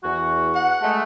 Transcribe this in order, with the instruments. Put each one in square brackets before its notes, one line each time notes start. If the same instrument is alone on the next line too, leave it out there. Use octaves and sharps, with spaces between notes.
[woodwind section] E2 F#4
[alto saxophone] F#5
[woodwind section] G#3 A3